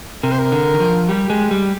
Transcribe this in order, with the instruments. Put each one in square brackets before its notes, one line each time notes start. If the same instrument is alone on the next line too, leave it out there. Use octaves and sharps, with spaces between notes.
[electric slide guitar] C3 [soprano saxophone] A#4
[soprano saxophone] C5
A#4
[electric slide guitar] D3
D#3
F3
[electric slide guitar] G3 [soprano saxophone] G4
[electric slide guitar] G#3
G3